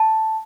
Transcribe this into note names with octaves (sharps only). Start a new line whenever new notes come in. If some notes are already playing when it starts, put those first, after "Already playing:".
Already playing: A5